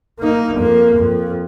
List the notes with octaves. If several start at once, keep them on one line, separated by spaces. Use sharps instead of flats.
A#3 D#4
F2 A#3
F2